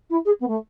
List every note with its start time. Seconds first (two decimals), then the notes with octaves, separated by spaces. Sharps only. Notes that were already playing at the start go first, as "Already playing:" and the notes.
0.10 E4
0.25 G#4
0.40 B3
0.47 A3